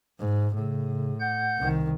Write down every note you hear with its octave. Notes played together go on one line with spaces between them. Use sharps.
G#2
A2 C#3
F#5 G6
C2 D#3